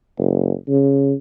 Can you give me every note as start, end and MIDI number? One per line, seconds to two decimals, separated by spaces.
0.18 0.52 30
0.68 1.13 49